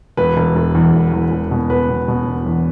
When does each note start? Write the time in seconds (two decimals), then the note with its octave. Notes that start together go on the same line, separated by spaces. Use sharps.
0.17 E1 B4
0.37 E1
0.56 E1
0.75 E2
0.93 E1
1.13 E2
1.31 E1
1.51 B2
1.70 E1 B4
1.89 B2
2.08 B2
2.27 E1
2.46 E2